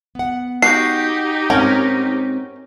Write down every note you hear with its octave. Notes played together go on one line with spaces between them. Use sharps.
B3 F#5
D#4 F#4 G4 C7
G#2 C4 C#4 A#4 F#5